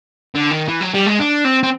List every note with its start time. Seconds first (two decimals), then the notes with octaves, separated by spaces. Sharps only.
0.35 D3
0.51 D#3
0.68 E3
0.81 F#3
0.94 G3
1.06 G#3
1.19 D4
1.45 C4
1.63 C4